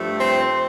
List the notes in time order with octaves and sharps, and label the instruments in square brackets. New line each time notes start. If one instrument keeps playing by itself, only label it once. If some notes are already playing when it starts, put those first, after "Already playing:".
Already playing: [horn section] G2 F3 A3
C4